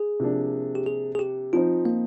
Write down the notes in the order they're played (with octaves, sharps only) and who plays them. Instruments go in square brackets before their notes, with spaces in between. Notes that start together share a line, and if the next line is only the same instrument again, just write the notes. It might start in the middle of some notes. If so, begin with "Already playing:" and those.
Already playing: [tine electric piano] G#4
[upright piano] C3 F3 A#3 D4
[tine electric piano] G4
G#4
G#4
G4
[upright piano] F3 C4 D#4 [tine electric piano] F4
[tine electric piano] A#3